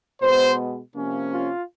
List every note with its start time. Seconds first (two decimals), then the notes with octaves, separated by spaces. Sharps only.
0.22 B2 G#3 B3 C5
0.94 C3 F3 A#3 C#4
1.29 F4